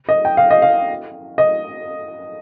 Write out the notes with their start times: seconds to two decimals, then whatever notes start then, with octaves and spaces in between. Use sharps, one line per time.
0.09 D#5
0.25 G5
0.37 F5
0.51 D#5
0.62 F5
1.38 D#5